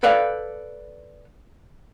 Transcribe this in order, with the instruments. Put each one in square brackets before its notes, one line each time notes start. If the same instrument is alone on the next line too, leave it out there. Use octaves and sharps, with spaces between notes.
[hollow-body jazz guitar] A4 B4 D5 F5 F#5